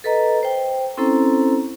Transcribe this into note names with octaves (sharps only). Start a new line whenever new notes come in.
A4 B4 D#5 A#5
C5 G5
C4 C#4 E4 A4 C5 A#5